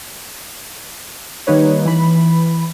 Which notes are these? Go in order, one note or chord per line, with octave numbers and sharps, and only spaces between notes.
D#3 G3 A#3 D#4 B4 C#5
E3 B5